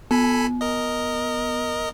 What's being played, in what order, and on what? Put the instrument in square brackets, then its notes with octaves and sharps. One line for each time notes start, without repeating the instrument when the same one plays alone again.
[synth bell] B3 [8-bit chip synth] A4 G#5 B5
[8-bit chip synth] A#4 D#5